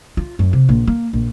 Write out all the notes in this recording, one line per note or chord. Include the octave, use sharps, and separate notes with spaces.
F4
F#2
C3
A#1
A#3
A#1